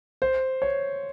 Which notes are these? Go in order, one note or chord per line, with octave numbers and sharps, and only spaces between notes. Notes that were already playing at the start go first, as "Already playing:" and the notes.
C5
C#5